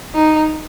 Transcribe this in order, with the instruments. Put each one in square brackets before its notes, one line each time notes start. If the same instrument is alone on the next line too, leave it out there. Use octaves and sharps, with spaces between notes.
[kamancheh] D#4